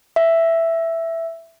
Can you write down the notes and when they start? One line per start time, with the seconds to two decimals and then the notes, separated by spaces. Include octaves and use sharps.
0.16 E5